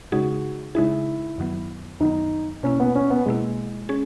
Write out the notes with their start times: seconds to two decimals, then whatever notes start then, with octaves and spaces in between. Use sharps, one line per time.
0.12 C#3 G#3 D#4 F#4 G#4
0.75 C#3 G#3 D#4 E4 G#4
1.38 F#2 D#3 F#3 B3
2.00 F#2 D#3 F#3 B3 D#4
2.63 B2 A#3 C#4 E4
2.80 B3
2.95 C#4
3.10 B3
3.26 B2 G#3 A#3 E4
3.89 C#4 G#4